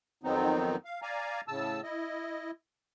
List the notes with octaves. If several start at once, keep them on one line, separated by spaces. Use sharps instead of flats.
F2 D#3 F#3 B3 C4 D#4
F5
D5 F5 G#5 A#5
A2 C#3 A5 E6
E4 D#5